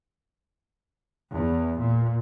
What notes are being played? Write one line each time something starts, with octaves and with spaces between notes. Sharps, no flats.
E2
A#2